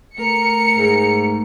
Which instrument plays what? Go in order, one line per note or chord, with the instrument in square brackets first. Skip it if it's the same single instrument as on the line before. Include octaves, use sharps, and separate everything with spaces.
[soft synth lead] A3 [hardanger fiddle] A#4 [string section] C#7
[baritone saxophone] G#2